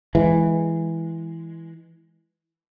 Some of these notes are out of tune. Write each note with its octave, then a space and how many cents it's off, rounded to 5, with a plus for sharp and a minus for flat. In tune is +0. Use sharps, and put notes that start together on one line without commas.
E3 +0 G#3 +0